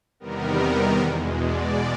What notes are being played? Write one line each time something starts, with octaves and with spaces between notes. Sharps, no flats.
E2 C3 D#3 G3 B3 A#4
E2 B2 G#3
D5